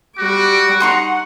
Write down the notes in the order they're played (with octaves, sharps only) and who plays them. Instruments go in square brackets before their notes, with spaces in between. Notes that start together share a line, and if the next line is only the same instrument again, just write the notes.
[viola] G3 D6 [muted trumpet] F#4
[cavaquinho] D#4 C6 C#6 [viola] F#5